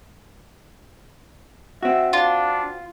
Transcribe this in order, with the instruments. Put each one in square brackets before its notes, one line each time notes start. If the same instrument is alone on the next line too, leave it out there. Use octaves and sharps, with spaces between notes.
[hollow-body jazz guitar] C4 F#4 [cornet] E5
[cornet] D4 [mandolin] F4